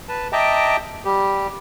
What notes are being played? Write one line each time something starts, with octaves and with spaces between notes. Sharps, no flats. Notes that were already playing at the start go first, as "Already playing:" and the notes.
B4 A5
D#5 E5 G5 A5 A#5 D6
G3 G4